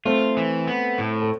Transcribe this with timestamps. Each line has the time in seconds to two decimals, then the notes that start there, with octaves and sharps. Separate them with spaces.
0.05 A3 C4 F4
0.37 E3
0.68 B3
0.98 A2
1.22 A4